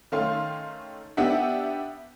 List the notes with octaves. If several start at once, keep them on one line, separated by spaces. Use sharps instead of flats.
D#3 A3 C#4 F5 C6
B3 D4 G4 E5 F#5